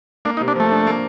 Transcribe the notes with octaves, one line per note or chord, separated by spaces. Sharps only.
A#3 D4
D#4
C3
D4
F3 A3
D4
A#3